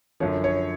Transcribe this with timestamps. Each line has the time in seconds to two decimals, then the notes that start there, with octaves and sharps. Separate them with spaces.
0.20 F#2 D3 F3 C#5
0.44 C#5